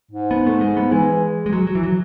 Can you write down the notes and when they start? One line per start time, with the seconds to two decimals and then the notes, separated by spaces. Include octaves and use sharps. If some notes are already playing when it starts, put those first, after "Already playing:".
0.11 G#2
0.31 B3
0.47 A3
0.61 G#3
0.77 B3
0.92 E3 G#3
1.46 G#3
1.53 F#3
1.67 F#3
1.75 E3
1.83 F#3